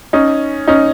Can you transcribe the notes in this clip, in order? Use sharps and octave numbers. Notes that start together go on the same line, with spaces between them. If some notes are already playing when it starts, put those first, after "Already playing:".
C#4 D#4
C#4 D#4